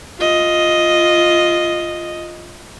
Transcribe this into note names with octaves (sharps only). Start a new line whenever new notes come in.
F4 D#5